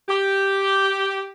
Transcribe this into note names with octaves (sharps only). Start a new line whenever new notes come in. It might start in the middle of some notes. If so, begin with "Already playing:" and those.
G4